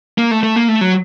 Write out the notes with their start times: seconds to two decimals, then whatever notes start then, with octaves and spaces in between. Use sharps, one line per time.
0.18 A#3
0.31 A3
0.43 A3
0.56 A#3
0.68 A3
0.81 F#3